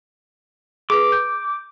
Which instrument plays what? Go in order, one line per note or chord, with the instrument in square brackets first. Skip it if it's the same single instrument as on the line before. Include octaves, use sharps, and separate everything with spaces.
[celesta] G#4 B4 [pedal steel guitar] D6
[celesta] G6